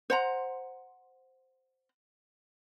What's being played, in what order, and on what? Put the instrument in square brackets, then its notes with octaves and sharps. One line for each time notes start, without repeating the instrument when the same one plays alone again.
[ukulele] C5 F#5 A#5